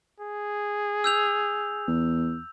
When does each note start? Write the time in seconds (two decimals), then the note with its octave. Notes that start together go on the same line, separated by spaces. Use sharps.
0.20 G#4
1.04 E6 G6 F7
1.87 E2